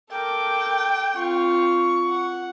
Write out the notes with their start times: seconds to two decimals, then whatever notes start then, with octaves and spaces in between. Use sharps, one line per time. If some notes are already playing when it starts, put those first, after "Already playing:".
0.12 A4 A#4 G5 D6
1.16 C4 F4 C#6
2.08 F#5